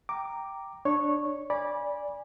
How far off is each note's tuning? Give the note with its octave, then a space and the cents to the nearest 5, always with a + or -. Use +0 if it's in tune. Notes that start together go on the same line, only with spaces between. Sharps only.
G5 +0 A#5 +0 D6 +0
D4 +10 C#5 +0 C#6 -15
D5 -5 G#5 -20 B5 -25